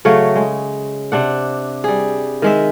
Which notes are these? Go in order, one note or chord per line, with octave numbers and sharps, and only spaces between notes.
C#3 F#3 A3 C#5
G#3
C3 D4 F#5
G3 G#4
D#3 G#3 E5